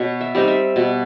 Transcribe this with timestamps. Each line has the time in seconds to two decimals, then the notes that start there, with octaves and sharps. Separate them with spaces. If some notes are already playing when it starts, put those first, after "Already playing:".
Already playing: B2 C#5
0.21 E5
0.35 G3 C4 D#4
0.48 E5
0.76 B2